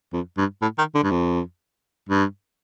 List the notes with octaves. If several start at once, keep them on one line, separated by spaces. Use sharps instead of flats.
F2
G2
A2
D#3
D3
G2
F2
G2